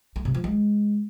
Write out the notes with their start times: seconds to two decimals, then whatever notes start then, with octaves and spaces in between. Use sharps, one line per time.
0.16 A3
0.25 C3
0.35 F3
0.44 G#3